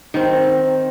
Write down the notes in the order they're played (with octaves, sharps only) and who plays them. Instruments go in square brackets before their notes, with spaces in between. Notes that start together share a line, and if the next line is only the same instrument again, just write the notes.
[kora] D#3 C4